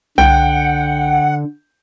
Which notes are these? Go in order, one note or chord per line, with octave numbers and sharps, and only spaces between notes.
C2 D3 F#5 G5